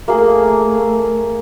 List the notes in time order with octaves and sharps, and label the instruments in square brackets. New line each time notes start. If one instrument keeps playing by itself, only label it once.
[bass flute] A3 [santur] A#3 G#4